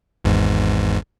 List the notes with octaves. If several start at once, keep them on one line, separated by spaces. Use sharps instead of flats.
G#1 E2 G#2